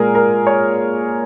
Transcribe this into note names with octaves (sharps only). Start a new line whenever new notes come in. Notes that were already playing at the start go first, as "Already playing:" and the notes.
Already playing: A#2 G#3 G#4 A#4
A#4
C#5